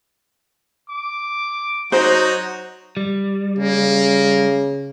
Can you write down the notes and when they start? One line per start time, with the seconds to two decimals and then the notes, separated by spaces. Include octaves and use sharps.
0.90 D6
1.92 F#3 D#4 F#4 C5
2.97 G3
3.58 C#3 A#3